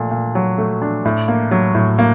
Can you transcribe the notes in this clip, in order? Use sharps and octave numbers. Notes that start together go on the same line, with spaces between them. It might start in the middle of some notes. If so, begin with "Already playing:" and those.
Already playing: A#2 A3 D4
A#2
F#3
A3
D4
A2
A#3
F#3
A2
A#3